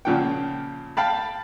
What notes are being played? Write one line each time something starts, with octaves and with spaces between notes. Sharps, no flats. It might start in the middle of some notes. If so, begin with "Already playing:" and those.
A#2 C#3 F3 F#5 G5
F5 G5 A5 B5